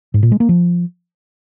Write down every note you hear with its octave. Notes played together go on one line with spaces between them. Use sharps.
G#2
A#2
G#3
A#3
F3